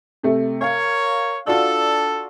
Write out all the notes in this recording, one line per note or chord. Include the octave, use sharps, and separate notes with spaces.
C3 A3
A#4 C#5 F5
D4 F4 F#4 A4 D5